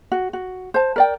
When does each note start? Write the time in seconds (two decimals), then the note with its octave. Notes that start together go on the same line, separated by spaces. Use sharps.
0.12 F#4
0.33 F#4
0.74 C5 A5
0.96 A#4 D5 G5